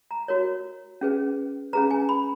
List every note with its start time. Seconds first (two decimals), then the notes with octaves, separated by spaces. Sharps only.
0.11 A#5
0.28 F#4 A#4 C#5
1.01 C#4 G#4 B4
1.73 C#4 G#4 B4 A#5
1.91 G#5
2.09 B5